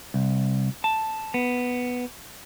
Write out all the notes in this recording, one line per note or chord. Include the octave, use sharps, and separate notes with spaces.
C2
A5
B3